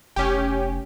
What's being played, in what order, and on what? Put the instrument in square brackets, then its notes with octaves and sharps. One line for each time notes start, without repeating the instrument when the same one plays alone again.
[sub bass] F1 [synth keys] C#4 G4